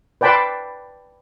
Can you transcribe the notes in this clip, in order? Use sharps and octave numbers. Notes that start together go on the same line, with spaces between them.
B4 D5 G5 A5 B5 C6